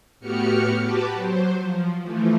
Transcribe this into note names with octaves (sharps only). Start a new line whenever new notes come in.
A2 B3 F#4 G4 F6 C#7
F#4 G4 B4 A5 D6
F#3 C5
F3
E3 F3 A3